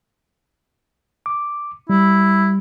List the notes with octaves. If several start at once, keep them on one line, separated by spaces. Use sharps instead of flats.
D6
G3 E4